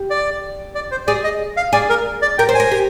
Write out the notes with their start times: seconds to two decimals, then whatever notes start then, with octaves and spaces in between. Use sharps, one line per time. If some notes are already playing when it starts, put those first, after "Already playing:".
Already playing: G4
0.10 D5
0.75 D5
0.91 C5
1.07 G#4 D5
1.24 D#5
1.57 F5
1.73 G#4 D5
1.89 A#4
2.22 D5
2.38 A#4 G5
2.49 C5
2.55 G#5
2.60 A#4
2.71 G4